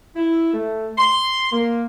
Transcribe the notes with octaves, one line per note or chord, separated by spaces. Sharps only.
E4
A3
C6
A#3